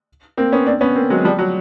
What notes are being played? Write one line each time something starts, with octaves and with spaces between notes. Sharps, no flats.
A#3 C4
B3 C#4
C4 D4
B3 C#4
A#3 C4
F#3 G#3
F3 G3
F#3